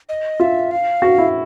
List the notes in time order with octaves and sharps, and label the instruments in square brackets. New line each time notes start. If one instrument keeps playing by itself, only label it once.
[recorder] D#5
[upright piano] F4 [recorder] E5
[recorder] F5
[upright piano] F#4
E4